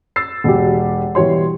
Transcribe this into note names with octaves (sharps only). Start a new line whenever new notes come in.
E6 A6 C7
E1 F#3 G4
B2 E3 G3 C#5 C6